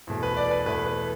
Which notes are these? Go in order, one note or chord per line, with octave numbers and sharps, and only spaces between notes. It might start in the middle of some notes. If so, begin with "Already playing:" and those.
E2 B2 A3
B4
D5
B4
E2 B2 A3 B4
B4